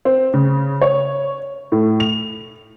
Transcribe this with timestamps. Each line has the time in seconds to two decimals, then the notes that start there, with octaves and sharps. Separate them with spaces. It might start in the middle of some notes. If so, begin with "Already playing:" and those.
0.05 C4
0.34 C#3
0.81 C#5
1.72 A2
2.00 F7